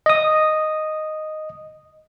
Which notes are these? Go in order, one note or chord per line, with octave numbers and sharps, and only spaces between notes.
D#5 D#6